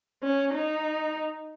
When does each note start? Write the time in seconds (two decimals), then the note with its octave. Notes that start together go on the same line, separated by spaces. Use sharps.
0.23 C#4
0.54 D#4